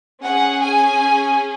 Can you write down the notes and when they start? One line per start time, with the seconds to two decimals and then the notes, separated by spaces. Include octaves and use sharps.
0.23 C#4 G#4 F#5
0.61 G#5